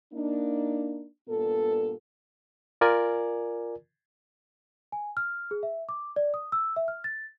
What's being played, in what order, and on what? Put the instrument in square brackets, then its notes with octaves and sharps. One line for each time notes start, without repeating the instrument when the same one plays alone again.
[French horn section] A#3 D4 D#4
G2 A#2 B3 A4
[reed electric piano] F4 A#4 D5 G#5
[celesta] G#5
F6
G#4
E5
D6
D5
D#6
E6
E5
F6
A6